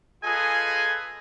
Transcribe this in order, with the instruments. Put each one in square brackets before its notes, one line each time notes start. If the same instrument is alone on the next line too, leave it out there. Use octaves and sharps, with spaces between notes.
[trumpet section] F4 G#4 A4 B4 D#5 G#5